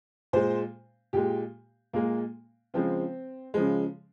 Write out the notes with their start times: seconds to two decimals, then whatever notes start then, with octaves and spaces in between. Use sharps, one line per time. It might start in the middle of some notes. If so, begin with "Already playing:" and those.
0.33 A#2 G#3 C5
1.13 A#2 G#3 G4
1.93 A#2 G#3 A#3
2.74 C#3 F3 G#3 C4
3.54 C#3 F3 G#3